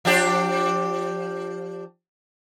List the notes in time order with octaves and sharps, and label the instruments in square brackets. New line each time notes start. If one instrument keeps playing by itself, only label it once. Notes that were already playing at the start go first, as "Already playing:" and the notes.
[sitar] F3 D4 G4